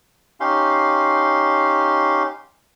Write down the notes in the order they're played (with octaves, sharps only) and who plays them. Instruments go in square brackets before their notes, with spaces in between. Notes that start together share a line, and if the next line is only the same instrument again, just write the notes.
[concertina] C#4 D#4 G4 F5 C6